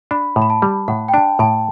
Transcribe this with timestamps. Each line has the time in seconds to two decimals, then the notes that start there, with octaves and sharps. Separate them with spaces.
0.11 D4 B5
0.36 A2
0.42 B5
0.50 A5
0.62 G3
0.88 A2 F#5
1.08 G5
1.14 D4 A5
1.39 A2 A5